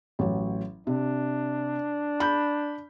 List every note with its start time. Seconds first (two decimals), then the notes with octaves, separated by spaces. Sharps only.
0.19 A1 F#3
0.87 C3 D4
2.20 B5 G6